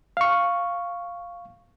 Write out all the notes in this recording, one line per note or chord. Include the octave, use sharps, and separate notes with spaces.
F5 C#6